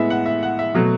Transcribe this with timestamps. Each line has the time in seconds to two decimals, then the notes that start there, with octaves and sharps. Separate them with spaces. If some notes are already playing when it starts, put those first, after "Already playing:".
Already playing: A2 G#3 B3 E5
0.10 F#5
0.26 E5
0.43 F#5
0.59 E5
0.74 B2 F#3 A3